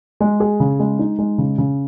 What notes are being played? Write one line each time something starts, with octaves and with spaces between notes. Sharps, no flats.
G#3
G#4
C#3
G#3
D#4
G#3
C#3
C#3